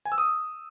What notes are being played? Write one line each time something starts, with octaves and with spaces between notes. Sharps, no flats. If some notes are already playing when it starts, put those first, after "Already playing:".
G#5
E6
D#6